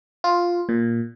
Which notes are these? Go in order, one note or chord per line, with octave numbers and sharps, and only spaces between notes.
F4
A#2